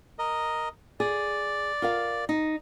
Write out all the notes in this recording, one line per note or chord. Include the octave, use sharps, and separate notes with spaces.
A#4 D#5
G#4 D5
F4 A#4 F5
D#4